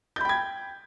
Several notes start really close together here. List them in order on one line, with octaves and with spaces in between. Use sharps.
G6 B5 G5 G#6